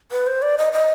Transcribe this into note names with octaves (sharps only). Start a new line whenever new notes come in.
B4
C5
D5
D#5
D#5